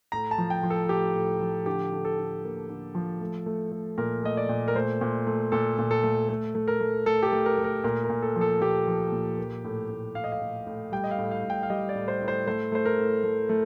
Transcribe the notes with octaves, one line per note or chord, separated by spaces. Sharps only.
A2 A#5
A5
F3
G5
F3
A4
A2 G4
A2
F3
D3 G4
D3
A4
D3
A#3
D3
F3
A3
A3
A3
A#2 A#4
A3 D#5
D5
A#2
A#4
A3 C5
A#2
A3
A#2 A4
A#2
A4
A3
A3
A3
A#4
A3
A3 A4
G4
A4
A3
A#4
A3
A#4
A#2 A#4
A#4
A#2
A4
F3
A4
A#2 G4
F3
A#2
A#3
A2
A2
A2 F5
D#5
F5
A2
A2
G3 G5
D#5
F5
A2
F5
A2
G5
F5
G3 D#5
D5
A2
C5
A2
C5
A3 C5
A3 C5
A#4
A2
A3
A3